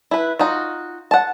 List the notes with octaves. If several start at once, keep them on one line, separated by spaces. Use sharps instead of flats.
E4 B4
D#4 F4 F#4
F#5 A5